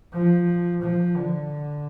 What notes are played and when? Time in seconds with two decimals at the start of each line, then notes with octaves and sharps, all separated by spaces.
0.13 F3
0.82 F3
1.16 D3